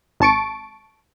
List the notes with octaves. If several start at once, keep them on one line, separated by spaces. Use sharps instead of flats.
G#1 A5 C#6 D7